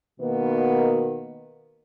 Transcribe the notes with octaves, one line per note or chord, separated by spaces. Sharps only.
B2 D#3 A#3 B3